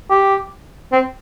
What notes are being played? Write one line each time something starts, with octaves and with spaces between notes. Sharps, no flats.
G4
C4